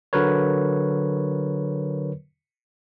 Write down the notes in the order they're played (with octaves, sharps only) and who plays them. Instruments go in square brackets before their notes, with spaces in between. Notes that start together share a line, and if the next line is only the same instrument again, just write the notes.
[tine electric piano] D3 F#3 A#4 B4 C#5